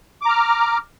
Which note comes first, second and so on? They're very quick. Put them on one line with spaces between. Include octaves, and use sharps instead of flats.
D6 A#5 F6